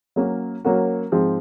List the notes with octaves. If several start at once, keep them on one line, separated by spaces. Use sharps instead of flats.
F#3 A#3 C#4 F#4 A#4
F#3 A#3 C#4 F#4 A#4
G#2 F3 G#3 C4